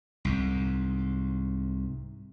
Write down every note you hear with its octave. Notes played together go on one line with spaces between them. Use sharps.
C2 G#2